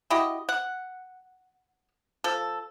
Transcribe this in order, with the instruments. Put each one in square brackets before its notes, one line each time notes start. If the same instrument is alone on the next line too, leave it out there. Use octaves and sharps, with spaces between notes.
[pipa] E4 F#4 G4 D#5
F#5
F3 A4